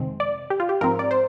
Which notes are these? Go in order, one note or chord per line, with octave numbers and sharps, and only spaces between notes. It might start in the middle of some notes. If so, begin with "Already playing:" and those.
Already playing: F2 C3 D#3 G#3 C4
D5
G4
F4
G4
G#2 F3 C4 A#4
D5
C5